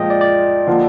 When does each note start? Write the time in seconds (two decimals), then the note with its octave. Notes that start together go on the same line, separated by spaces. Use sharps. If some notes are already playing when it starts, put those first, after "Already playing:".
Already playing: A#2 F3 G#3 D#5 G5
0.10 D5
0.21 D5
0.67 D3 F3 A#3 F4